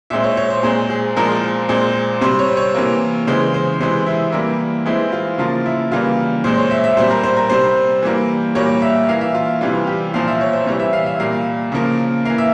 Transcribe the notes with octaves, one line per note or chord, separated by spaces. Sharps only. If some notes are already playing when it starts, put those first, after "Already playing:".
A#2 G#3 C4 E5
C#5
C#5
C5
A#2 G#3 C4 G#4
G#4
A#2 F3 G#3 C4 A#4
A#2 G#3 C4
C3 G3 C4 C5
C#5
C#5
C3 E3 A#3
C#3 E3 G#3 C5
C5
C3 E3 G#3 C5
E4
E3 G3 A#3
E3 G#3 C4 E4
F4
C#3 F3 A#3 F4
E4
C#3 E3 G3 A#3 F4
A#2 G#3 C4 C5
C#5
E5
E5
A#2 G3 C4 C5
A#4
C5
A#4
C3 G3 C4 C5
E3 G3 A#3
A#2 G3 A#3 C#5
E5
E3 A#3 F5
E5
F4
C3 E3 G3 F4
G4
A#2 F3 C4 F5
E5
C#5
C5
C3 E3 G3 C#5
E5
F5
E5
A#2 G3 A#3 F5
C#3 F3 A#3
E3 A#3 F5
E5